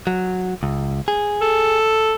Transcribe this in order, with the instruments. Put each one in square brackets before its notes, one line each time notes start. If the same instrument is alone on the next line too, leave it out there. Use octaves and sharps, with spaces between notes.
[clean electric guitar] F#3
C#2
G#4
[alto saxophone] A4